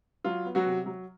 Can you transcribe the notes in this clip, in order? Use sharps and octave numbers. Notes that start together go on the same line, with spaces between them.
F#3 F4
B3
F#3 F#4
C3
F#3